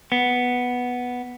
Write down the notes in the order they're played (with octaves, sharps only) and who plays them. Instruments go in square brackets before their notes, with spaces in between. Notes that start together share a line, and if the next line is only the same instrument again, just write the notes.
[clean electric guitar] B3